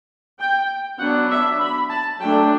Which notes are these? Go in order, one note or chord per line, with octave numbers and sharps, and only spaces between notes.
G5
F#3 B3 D4 F#5
E5
B5
A5
F#3 A3 D4 G5